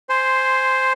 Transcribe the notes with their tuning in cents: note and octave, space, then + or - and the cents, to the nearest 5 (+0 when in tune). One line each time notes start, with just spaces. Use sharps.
C5 +0 G#5 +0 C6 -10